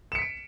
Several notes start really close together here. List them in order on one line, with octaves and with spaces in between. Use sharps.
E7 C#7 B6 D7